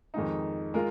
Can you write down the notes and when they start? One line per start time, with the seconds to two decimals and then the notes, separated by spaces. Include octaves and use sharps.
0.14 F2 D#3 G#3 D#4
0.74 G#3 F4 A#4